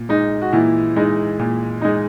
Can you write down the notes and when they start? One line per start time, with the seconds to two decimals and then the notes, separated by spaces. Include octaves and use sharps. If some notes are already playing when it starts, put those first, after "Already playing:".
Already playing: A#2
0.09 G#3 D#4
0.41 F#4
0.53 A#2 E3 E4
0.96 G#3 D#4
1.39 A#2
1.82 G#3 D#4